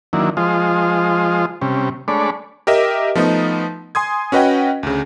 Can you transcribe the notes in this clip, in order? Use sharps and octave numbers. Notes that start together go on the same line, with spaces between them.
D#3 F#3 A#3 D4 E4
F3 G#3 F4 C5 D#5
C3 G3 C#4
G#3 A3 D4 C#5 D5 B5
G4 A#4 D#5 E5
F3 A3 B3 D#4
G#5 C6 D#6 G#6
C#4 F#4 B4 D#5 F#5 G5
D2 C#3